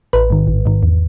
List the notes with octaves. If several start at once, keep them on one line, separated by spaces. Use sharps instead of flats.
A1 B4
G#2 D#3
A1
G#2 D#3
E2